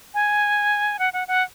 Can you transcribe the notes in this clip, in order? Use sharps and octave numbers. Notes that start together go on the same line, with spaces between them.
G#5
F#5
F#5
F#5